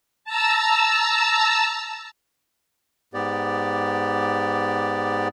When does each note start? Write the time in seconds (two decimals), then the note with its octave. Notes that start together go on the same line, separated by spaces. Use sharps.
0.24 A5 A#5 E6
3.14 G#2 B3 G4 D5